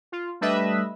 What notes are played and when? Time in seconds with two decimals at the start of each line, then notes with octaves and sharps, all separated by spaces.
0.12 F4
0.41 G3 A3 D4 B4 D#5 E5